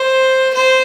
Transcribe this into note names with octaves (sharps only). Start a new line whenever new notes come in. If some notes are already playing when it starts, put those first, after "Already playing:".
Already playing: C5
C5